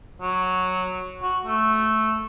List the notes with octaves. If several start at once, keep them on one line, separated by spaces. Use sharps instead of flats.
F#3
F#4
A3